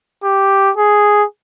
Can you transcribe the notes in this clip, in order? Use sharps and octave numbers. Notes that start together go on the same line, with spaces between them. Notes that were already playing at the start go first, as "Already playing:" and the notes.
G4
G#4